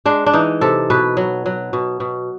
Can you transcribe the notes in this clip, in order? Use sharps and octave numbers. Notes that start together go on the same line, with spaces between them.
G#3 D4
D4
E3 D#4
C3 A4
B2 B4
F#3
F#3
B2
B2